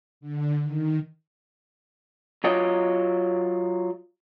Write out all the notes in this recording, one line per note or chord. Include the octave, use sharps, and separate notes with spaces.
D3
D#3
F#3 F4 C#5 D#5